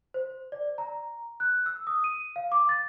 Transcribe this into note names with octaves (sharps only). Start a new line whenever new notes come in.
C5
D5
A#5
F#6
E6
D#6
D#7
F5
D6
A6